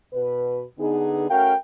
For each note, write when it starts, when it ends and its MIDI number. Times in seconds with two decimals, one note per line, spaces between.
0.13 0.64 47
0.13 0.64 71
0.79 1.30 50
0.79 1.30 59
0.79 1.30 63
0.79 1.30 68
1.30 1.54 57
1.30 1.54 61
1.30 1.54 66
1.30 1.54 70
1.30 1.54 77
1.30 1.54 79